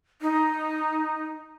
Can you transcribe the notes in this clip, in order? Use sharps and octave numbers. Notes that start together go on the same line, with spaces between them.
D#4